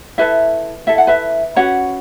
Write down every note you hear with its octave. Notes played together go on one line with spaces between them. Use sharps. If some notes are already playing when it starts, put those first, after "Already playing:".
E4 A4 B4 E5
E4 A4 E5
F#5
B4 E5
C#4 F#4 B4 C#5 F#5